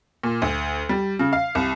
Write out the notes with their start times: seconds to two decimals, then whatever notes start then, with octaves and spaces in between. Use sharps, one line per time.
0.23 A#2
0.42 D2
0.89 G3
1.19 C#3
1.33 F5
1.55 C2